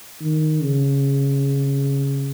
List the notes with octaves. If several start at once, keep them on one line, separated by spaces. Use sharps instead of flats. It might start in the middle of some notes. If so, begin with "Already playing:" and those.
D#3
C#3